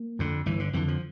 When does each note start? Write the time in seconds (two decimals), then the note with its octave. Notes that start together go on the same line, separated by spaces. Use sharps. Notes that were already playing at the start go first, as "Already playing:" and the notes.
Already playing: A#3
0.19 F2 D3
0.46 G1 E3
0.60 D3
0.73 F2 D3 E3
0.88 F3